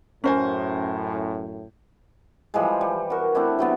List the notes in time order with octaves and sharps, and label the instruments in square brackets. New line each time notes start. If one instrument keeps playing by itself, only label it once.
[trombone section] F#2 A2 [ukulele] C#4 F#4 [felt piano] A#4 C5 G#5
[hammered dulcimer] E3 F3 G3 G#3
G3
F#4 A#4
A3 C4 D4 E4
C3 F#3 B3